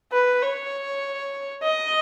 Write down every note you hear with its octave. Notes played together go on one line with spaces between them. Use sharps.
B4
C#5
D#5